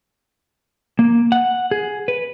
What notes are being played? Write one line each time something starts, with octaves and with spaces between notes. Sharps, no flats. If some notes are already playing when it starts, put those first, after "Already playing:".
A#3
F#5
G#4
B4